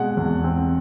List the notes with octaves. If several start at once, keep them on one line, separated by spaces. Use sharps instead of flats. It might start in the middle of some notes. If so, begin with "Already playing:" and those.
Already playing: B2 G#3 C4 F#5
E2
C4